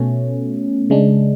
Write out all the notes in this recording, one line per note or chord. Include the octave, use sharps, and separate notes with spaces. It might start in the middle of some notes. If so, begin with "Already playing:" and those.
Already playing: B2 A3 C#4
C#3 G#3 D4